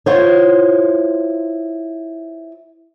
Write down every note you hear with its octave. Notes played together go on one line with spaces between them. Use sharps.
E4 F4 C5 C#5